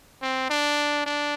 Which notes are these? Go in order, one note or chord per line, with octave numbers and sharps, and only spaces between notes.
C4
D4
D4